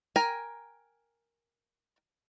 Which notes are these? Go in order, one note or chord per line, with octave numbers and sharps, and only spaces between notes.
A#4 G5 G#5 A#5